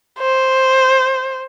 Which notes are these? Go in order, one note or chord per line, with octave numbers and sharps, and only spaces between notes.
C5